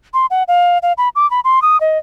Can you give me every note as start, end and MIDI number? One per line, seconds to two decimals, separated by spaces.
0.14 0.26 84
0.30 0.43 78
0.48 0.78 77
0.83 0.93 77
0.98 1.09 83
1.16 1.29 86
1.31 1.40 83
1.44 1.62 84
1.62 1.79 87
1.80 1.98 75